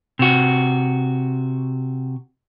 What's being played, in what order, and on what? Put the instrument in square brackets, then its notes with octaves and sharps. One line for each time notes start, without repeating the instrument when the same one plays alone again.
[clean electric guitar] C3 F#4